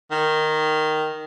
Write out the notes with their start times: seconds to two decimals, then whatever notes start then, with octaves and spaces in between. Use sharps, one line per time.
0.11 D#3